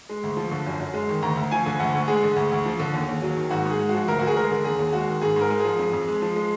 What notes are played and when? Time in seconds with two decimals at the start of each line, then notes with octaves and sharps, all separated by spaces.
0.09 G#3
0.23 D2
0.37 F3
0.52 D3
0.66 F#2
0.80 F#2
0.94 G#3
1.09 D#3
1.22 D2 A#5
1.37 D2
1.51 F3 G#5
1.66 D3
1.79 D2 F#5
1.94 D2
2.08 G#3 G#4
2.23 D3
2.36 D2
2.51 D2
2.66 F3
2.80 D3
2.94 D#2
3.08 D#2
3.22 F#3
3.37 D#3
3.50 G#2 F#4
3.65 G#2
3.70 G#4
3.79 G#3
3.89 F#4
3.94 F3
4.08 D2 A#4
4.19 D2 F#4
4.27 G#4
4.37 G#3 A#4
4.51 D3
4.64 D#2 G#4
4.79 D#2
4.93 G#3 F#4
5.08 D#3
5.22 G#2 G#4
5.36 G#2 A#4
5.50 G#3
5.60 F3 G#4
5.79 F2
5.93 F2
6.08 G#3
6.22 F3
6.36 G#3